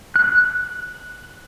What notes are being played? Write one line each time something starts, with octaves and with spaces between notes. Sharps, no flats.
F#6